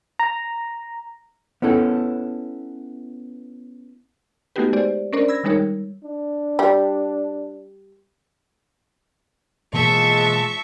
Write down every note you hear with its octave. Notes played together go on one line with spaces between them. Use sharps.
A#5
B3 C#4 E4 A4
A3 B3 D#4 F#4 G4 B4
G#3 G4 C5 D5
C#4 D4 A#4 C5 D5
B5 E6 G#6 A#6
D#3 G3 G#3 D#4 A#4 C#5
G3
D4
G3
B2 E3 F3 G#3 A#3 E5 A5 C#6